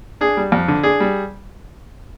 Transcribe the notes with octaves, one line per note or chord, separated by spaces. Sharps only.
D4 G#4
G3
F2
D3
D4 G#4
G3